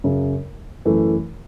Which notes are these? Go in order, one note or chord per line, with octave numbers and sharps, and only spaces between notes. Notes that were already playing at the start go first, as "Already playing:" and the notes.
F#2 C#3 F#3
F#2 E3 A3